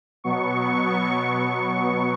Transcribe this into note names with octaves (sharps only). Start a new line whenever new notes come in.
B2 F#3 B3 C#6